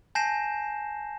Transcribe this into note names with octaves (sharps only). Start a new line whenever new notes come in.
G#5 A5 G6 A#6 C7 E7